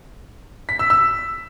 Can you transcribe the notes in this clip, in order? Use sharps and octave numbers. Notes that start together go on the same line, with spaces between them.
B6
E6
E6